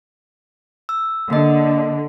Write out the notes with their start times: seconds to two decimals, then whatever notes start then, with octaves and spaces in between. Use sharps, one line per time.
0.89 E6
1.30 D3 A#3 D#5